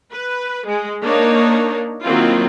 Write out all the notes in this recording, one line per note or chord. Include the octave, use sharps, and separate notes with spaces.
B4
G#3
A#3 D4 D#4 A#4 C#5
D#3 F#3 A#3 C4 E4 F4